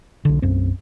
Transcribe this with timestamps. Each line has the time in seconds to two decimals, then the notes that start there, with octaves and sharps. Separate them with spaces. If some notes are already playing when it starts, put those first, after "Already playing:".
0.25 B1 D3
0.42 B1 F#2 C4